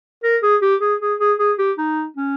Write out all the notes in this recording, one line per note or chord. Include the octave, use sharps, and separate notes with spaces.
A#4
G#4
G4
G#4
G#4
G#4
G#4
G4
D#4
C#4